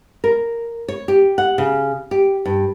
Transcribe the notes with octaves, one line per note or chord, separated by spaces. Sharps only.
A#4
C#5
G4
F#5
C#3
G4
G2